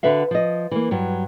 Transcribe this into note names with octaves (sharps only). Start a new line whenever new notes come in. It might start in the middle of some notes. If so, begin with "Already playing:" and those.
D3 F#4 B4 E5 F5
F3 D#5
E3 A#3
G2 F#3